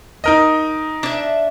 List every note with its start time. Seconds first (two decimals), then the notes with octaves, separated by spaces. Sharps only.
0.24 D#4 A#4 D#5
1.03 D4 E5